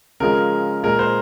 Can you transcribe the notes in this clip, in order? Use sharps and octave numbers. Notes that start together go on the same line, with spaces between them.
C#3 F3 G#3 A#4
A#2 G#3 A#4
C5